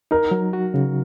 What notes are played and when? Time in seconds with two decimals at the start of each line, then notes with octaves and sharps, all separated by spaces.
0.11 D#4 A#4
0.31 F#3
0.53 F#4
0.74 C#3